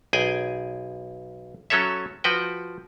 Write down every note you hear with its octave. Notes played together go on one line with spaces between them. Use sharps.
B1 G#4 G5 G#5
F#3 C#4 A4 C#5 E5
F3 F#4 B4 G5